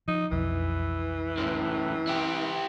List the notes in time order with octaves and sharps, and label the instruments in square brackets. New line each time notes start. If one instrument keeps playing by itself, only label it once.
[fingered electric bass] F3 [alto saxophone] D#4
[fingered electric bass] B1 F2 [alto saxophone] E3
[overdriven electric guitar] F#2 A2
E4 G4